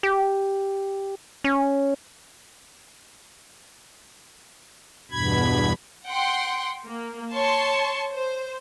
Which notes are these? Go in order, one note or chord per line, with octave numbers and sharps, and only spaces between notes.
G4
C#4
E2 G2 B2 B5 G#6
F#5 G5 C6
A#3
C#5 A5 C6 C#6
C5